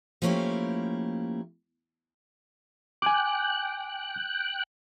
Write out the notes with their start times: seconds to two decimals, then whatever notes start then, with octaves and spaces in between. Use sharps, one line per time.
0.22 F3 A3 A#3 C#4 E4 G4
3.02 G5 G#5 D6 F#6